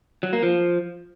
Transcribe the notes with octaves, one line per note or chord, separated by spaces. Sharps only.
F#3
A#3
F3